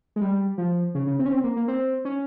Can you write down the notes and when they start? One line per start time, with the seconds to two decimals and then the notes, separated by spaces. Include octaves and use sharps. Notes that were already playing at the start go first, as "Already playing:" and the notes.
0.16 G#3
0.21 G3
0.58 F3
0.95 C#3
1.07 C#3
1.19 C4
1.26 C#4
1.32 C4
1.44 A#3
1.56 A#3
1.68 C4
2.05 C#4